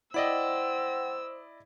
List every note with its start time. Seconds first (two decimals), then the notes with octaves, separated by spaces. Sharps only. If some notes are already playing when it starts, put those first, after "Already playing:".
0.14 E4 C5 D5 D#5 F#5 G5 E6